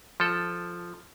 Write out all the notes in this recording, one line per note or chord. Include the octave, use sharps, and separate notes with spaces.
F3 A4